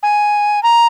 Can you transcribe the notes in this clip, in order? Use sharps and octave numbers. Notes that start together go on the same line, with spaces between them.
G#5
A#5